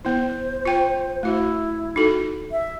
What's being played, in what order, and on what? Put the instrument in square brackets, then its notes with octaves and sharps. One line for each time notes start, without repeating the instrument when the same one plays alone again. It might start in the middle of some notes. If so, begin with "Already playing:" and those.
[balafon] B3 E4 [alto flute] C5
[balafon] F4 G5
[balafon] A3 F#4 [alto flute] E4
[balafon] D#4 F#4 A4
[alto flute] E5